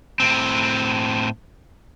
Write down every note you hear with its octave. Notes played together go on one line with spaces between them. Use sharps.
A2 C4